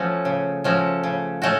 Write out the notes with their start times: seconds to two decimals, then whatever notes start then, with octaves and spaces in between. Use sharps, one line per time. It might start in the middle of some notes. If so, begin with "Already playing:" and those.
Already playing: F3 A3 C#4 F#4
0.25 C#3
0.64 F3 A3 C#4 F#4
1.04 C#3
1.42 A3 C#4 F#4